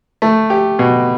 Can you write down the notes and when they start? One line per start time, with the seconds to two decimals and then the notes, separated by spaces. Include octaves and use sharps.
0.22 A3
0.50 G4
0.79 B2